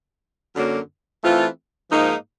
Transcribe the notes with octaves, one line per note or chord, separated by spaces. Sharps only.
F#2 D3 F#3 A#3
E3 A3 C4 F4
G#2 F3 A#3 D#4